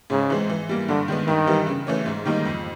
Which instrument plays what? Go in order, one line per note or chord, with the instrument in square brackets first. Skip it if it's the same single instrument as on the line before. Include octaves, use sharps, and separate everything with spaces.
[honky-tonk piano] G#2 [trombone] C#3
[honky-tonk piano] E3 G#3 C4
E3
G3 A#3
[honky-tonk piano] G2 [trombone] D3
[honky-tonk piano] D#3 G#3 B3
[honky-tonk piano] G2 [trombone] D#3
[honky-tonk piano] E3 G3
C#3
E3 A3 C#4
G#2
D#3 G3 A#3 D#4
F2